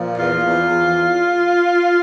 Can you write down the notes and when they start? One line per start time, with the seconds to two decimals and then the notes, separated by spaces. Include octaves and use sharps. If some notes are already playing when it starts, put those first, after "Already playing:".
Already playing: A#2 F3
0.18 E2 F4
0.43 E2
0.68 E2